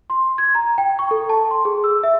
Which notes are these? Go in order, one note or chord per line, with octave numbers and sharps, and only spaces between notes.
C6
G#6
A#5
G5
C#6
A4
A5
C6
G#4
E6
E5